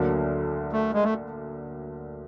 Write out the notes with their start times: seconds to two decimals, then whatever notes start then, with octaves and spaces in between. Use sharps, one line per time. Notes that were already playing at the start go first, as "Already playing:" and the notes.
Already playing: D2 D3 F#3 A#3 D4
0.72 A3
0.94 G#3
1.04 A3